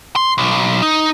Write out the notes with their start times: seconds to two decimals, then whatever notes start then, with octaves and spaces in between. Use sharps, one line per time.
0.16 C6
0.38 B1
0.83 D#4